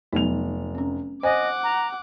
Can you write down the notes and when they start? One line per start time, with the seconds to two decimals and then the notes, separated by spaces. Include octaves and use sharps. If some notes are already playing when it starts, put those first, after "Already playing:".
0.13 F1 F#3 B3 D#4 F7
0.75 C4 C#4
1.23 C5 D#5 F#5 G#5 D6
1.64 A#5